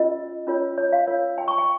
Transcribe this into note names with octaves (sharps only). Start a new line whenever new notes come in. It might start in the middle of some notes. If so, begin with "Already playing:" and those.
Already playing: C#4 F4 A#4 D#5
C#4 F4 A#4 C#5
C#5
F5
F4 A#4 C#5
G5
C#6
G5